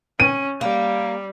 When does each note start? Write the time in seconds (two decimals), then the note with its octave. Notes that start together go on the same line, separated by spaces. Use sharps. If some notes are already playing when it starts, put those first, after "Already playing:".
0.20 C#4 D#7
0.61 G3 A#3